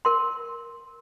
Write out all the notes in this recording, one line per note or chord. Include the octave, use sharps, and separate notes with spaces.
A#4 C6